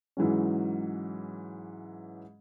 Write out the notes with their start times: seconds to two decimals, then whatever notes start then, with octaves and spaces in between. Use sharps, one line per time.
0.17 G#2 E3 F#3 C#4